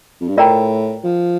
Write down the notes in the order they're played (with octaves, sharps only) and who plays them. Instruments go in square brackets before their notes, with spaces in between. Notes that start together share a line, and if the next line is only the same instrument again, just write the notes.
[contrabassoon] F2
G2
[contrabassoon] A2 [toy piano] F4 A#4 D5 G5 A#5
[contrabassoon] F3